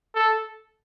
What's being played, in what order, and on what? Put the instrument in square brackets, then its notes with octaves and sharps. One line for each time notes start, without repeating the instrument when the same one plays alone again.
[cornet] A4